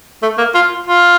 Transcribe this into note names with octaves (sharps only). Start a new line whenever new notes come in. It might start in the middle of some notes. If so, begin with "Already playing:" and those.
A3
A#3
F4
F4